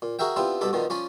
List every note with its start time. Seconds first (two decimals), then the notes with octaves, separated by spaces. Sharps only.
0.02 A#2
0.19 F#4 G#4 A#4 E5 G5
0.36 B3 C4 D4 E4 F4 G4
0.61 G2 B2 D3 A4 B5 D6
0.73 B2 D3 D#3 F3
0.90 F3 C#4 D5 G#5 B5